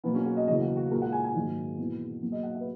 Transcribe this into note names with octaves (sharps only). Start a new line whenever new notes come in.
B2 F#3 A#3 B3
C#4
F#4
D#5
E2 C#3 F#3 A#3 D#5
F#4
F#4
A#2 G#3 A#4
F#5
G#5
G#5
G#2 D#3 F#3 A#3
E2 B2 A#3
B2 F#3 A#3
D#5
F#5
E5
B4